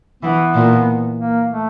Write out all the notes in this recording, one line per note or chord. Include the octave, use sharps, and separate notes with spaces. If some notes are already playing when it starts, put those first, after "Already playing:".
E3 B3
A#2
A#3
A3